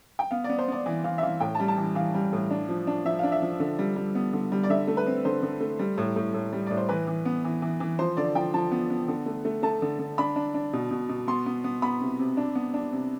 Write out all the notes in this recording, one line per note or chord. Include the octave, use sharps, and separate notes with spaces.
G5
B3 F5
D5
B3
C5
B3 D5
E3
E3 F5
E5
E3 F5
A2 G5
A5
G3
A5
E3
E3 F5
G3
A2
D4
F3
D4
F3 E5
D4 F5
E5
F3
D3
G3
G3
B3
D3
G3
D5
D3 E5
A3
B4
C4
D3 C5
D3
A3
G3
A2
A2
A2
G3
A2 D5
C5
E3 B4
E3
B3
E3
E3
E3
F3 C5
D3 D5
F3 G5
F3 A5
B3
B3
D3
A3
A3
A3 A5
D3
D3
D4 B5
D4
D4
B2
B2
B2
B3 C6
B3
B3
B3 B5
C3
C3
D4
B3
D4
C3